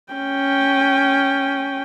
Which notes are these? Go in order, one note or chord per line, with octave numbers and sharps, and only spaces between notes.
C#4 G5